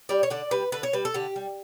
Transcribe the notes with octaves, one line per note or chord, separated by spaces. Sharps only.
G3 D5
C#5
D3 D5
G3 B4
D3 B4
C#5
G3 B4
A4
D3 G4
G3